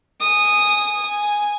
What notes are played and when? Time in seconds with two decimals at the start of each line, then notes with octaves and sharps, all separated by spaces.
0.21 G#5 D#6
1.07 G#5